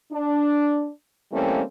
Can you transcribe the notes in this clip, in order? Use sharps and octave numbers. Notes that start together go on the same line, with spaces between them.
D4
E3 G3 A3 A#3 C4 C#4